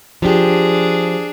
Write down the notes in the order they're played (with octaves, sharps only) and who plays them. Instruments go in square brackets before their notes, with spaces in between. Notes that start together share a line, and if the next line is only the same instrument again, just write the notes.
[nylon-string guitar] F3 G4 [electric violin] D4 G#4